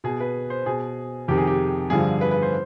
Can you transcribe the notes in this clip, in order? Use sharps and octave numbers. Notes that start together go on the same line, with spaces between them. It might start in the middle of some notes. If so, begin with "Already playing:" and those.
B2 G#4
B4
C5
B2 G#4
F2 C3 D#3 G4
G#4
G4
G2 D3 F3 G#4
B4
B4
C5